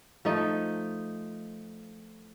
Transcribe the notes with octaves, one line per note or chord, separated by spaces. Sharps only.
F3 A3 D#4